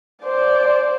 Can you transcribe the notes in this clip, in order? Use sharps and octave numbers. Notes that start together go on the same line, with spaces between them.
C5 D5